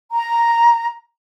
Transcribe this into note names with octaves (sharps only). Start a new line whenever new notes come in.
A#5